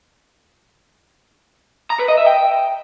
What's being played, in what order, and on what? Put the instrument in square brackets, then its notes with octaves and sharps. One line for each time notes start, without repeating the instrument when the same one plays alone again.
[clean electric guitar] A#5
B4
D#5
E5
G5